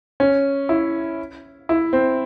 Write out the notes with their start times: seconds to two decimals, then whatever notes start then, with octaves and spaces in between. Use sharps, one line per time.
0.20 C#4
0.69 E4
1.69 E4
1.93 C4